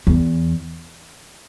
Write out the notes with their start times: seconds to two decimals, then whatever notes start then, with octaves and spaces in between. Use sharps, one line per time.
0.07 E2